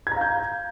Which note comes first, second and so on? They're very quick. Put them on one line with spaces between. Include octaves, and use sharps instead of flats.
G#6 A#5 F5 G6